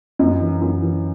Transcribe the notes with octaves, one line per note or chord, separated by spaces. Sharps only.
F#2 D#5
E3
F#2
E3